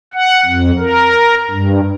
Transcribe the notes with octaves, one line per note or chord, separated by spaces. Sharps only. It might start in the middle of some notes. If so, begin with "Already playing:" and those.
F#5
F2
A#4
G2